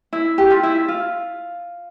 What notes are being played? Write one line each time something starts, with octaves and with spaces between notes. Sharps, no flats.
E4
G4
F4
E4
F4